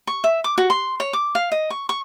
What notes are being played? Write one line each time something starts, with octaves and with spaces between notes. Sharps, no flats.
C#6
E5
D6
F#4
C6
C#5
D6
F5
D#5
C#6
C#6